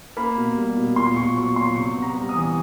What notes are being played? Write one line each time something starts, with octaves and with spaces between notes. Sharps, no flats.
A#3 B5
B2
G3
B2
A#2 C6
A#2 C#6
F#3 C#6
A#2 C6
C3 C#6
B3
A#5
G3
D#6
E3